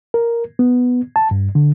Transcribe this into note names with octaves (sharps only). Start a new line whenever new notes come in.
A#4
B3
A5
G2
D3